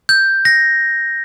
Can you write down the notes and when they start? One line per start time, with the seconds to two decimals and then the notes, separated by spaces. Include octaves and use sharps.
0.09 G6
0.45 A#6